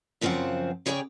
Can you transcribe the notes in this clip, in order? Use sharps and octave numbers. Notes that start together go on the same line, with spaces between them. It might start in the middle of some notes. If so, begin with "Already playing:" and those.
F#2 C#3 F3 C4 F5 F#5
C#3 G#4 C#5 D5 F5 G5